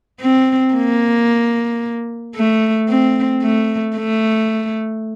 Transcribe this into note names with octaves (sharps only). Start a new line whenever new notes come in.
C4
A#3
A3
C4
A3
A3